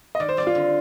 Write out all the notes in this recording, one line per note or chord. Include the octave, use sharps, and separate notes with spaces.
D#5
D#3 D5
C5
G3 C4 G4 D5
F4
D3